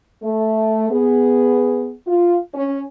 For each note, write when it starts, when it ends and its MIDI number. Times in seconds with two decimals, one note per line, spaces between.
0.23 0.88 57
0.90 1.93 59
0.90 1.93 68
2.07 2.36 65
2.54 2.81 61